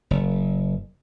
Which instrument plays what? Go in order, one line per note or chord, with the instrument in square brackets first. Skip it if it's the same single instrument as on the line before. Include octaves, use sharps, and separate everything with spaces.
[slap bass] F#1